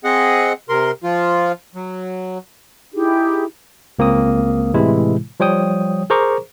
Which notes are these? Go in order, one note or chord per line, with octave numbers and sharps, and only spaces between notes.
C4 G#4 D#5 F#5
C3 A#4 C6
F3 F4
F#3
D#4 E4 G4 G#4
C#2 A#3 C4 D#6
A2 C3 E3 G#3 E4
F3 G3 C#5 G5 D#6
G#4 A#4 C5 A#5 C#6 D6